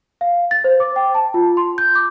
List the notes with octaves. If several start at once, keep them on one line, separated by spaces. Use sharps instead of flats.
F5
A6
C5
D6
G5
A5
F4
C6
G6
D6